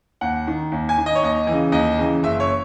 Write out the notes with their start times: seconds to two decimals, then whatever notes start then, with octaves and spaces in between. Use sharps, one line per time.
0.21 D#2 F#5
0.48 D#3
0.72 D#2
0.89 G#5
0.98 D#3
1.06 D#5
1.15 C#5
1.23 D#2 D#5
1.47 C#3 E3
1.72 D#2 D#5
1.98 C#3 E3
2.23 F#1 E5
2.40 C#5